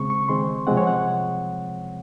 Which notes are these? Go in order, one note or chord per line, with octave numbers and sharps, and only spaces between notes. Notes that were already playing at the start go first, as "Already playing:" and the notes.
Already playing: C#3 G#3 C4 C#6
C#6
D#3 G#3 C4 C6
C3 F3 G#3 C4 F#5
C#5
F#5